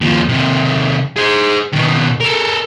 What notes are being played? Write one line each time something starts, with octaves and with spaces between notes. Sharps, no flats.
D#2 F3
C3 D#3
G#4 C5
D#2 B2
A4 A#4